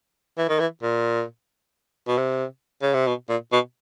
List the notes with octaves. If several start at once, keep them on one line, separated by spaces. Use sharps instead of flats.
E3
D#3
E3
A#2
B2
C3
C#3
C3
B2
A#2
B2